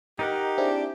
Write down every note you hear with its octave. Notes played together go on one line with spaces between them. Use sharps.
D#4 G4 A#4 D#5 F#5
C4 D4 E4 G#4